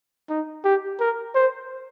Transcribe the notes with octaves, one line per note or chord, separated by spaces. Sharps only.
D#4
G4
A#4
C5